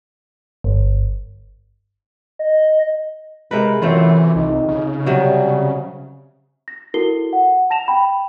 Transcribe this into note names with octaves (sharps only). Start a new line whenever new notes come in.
G1
D#5
C3 G#3 A#4 B4
F#2 E3 A3 C4 F4
C2 D#4
C#3
C3 F#3 G3
A#6
E4 F#4 A4 A#4 C7 G7
F#5
A5 A#6 E7 F7
G5 B5